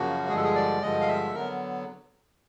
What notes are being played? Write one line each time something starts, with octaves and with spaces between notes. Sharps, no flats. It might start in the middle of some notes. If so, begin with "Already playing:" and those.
Already playing: F#2 C#3 F3 A#3 F#4
G2 D3 F3 G#3 G#4
A4
G#4
D5
G2 D3 F3 G#3 D#5
F5
E5
A4
D3 F#3 B3 A#4